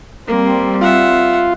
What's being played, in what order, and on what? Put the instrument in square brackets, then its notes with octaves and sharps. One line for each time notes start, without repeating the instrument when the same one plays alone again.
[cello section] G3 C4 [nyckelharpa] A#3
[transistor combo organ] F4 [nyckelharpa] E5 F#5